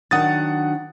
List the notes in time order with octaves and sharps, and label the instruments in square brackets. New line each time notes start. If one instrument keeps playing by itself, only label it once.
[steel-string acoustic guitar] D#3 F#3 D4 [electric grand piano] F#5 D#6 A6